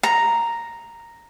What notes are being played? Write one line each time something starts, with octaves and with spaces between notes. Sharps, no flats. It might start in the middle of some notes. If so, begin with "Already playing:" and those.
A#5